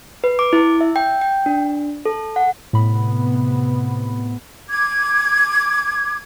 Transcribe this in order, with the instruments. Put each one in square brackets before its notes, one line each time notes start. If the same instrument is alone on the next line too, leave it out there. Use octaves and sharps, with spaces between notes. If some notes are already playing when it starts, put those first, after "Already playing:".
[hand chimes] B4
D6
E4
E5
G5
G5
D4
A4
F#5
[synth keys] A2 B5 [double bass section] C3 B3
[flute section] D6 G#6